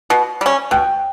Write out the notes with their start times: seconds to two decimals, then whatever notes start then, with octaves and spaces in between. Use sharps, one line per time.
0.10 B2
0.41 G3 C#4
0.71 B2 G5